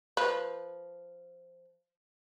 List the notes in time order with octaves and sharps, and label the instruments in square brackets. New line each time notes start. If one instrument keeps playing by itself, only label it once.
[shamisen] F3 B4